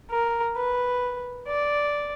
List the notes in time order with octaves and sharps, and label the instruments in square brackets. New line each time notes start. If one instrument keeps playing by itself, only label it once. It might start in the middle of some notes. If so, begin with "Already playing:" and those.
[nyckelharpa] A#4
B4
D5